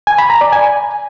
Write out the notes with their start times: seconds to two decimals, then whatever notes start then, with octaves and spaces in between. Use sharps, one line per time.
0.07 G#5
0.18 B5
0.30 A#5
0.41 D5
0.52 G#5